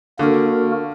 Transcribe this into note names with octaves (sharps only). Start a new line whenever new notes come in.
D3 A#3 F#4 A#4